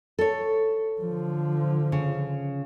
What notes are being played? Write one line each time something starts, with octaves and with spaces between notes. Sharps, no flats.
A4 C#5
D3 F3
C#3